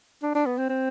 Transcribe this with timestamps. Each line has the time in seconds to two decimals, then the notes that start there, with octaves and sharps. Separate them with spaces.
0.23 D4
0.35 D4
0.46 B3
0.58 C4
0.69 C4